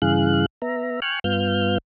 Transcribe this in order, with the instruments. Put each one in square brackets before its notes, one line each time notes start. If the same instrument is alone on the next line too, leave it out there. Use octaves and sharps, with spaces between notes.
[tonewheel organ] G2 C#3 E3 G#4 F5 F#6
B3 E5 A#5
G5 G#5 C#6 F6 F#6
G2 B3 F4 F6 G6